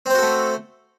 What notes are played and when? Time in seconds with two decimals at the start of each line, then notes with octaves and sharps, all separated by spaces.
0.06 C4
0.10 C5
0.14 F#4
0.18 A4
0.23 A3